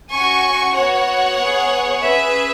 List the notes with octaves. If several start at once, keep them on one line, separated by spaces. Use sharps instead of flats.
C#4 F#4 G#5 C#6
B3 F#4 C#5 F#5
B3 G#4
C#4 G#4 B4 E5